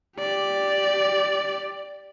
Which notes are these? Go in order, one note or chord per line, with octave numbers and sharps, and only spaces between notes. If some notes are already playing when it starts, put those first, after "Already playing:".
G4 D5